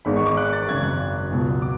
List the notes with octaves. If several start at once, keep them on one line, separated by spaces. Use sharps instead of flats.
G#1 G#2 G#3 B3 B5
C#6
D6
F#6
A6
G#1 F#2 C#3 G#6
F#6
C#2 B2 F#3 B3
D6